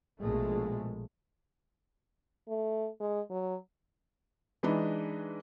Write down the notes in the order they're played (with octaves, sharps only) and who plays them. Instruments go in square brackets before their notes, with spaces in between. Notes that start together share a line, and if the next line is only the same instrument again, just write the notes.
[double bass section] A#1 B2 F3 G#3 A3
[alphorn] A3
G#3
F#3
[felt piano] E3 G#3 D4 D#4 B4 D#5